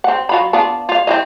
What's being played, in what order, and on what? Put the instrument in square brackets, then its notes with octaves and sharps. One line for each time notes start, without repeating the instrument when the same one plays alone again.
[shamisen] C4 F#5
F#3 F4 B5
B3 D4 F4
F4 F5
C4 E4 D#5